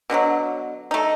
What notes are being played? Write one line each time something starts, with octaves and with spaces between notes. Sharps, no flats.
B2 D3 E3 F#3
A3 D#4